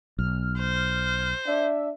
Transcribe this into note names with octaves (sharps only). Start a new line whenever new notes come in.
B1 F6
C5
D4 E5